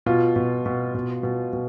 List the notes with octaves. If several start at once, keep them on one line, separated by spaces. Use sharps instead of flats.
B2 F4
B2
B2
B2
B2
B2